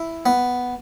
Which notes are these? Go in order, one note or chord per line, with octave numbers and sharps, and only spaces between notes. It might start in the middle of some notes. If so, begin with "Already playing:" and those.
Already playing: E4
B3